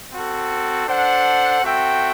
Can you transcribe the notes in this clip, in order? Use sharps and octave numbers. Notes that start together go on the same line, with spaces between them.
C4 F#4 A4
D4 A4 C5 F#5
C4 F#4 A4 E5 G5